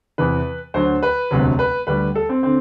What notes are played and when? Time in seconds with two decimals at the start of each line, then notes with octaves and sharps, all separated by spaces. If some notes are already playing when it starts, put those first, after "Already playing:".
0.18 E2 C3 E3 B4
0.74 D2 D3 F#3 C5
1.02 B4
1.31 E1 D2 C3 F#3
1.59 B4
1.87 D2 D3 G3 B4
2.15 A4
2.29 C4
2.43 D3 C4